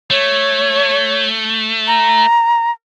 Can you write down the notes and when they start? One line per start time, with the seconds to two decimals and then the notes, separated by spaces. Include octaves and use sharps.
0.10 A3 C#5
1.87 A#5